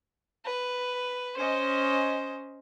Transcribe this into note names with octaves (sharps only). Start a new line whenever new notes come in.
B4
C#4 C5 D#5